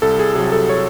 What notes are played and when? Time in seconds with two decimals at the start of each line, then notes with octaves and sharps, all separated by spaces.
0.02 C2 A4
0.19 G#4
0.35 C3 F#3 G#4
0.52 A4
0.69 C#5